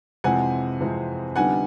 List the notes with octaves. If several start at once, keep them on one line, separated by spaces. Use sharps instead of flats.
F2 C3 E3 G#3 C4 F#5 G#5
F2 C3 E3 G#3 C4
F2 D3 G3 B3 D#4 F#5 G#5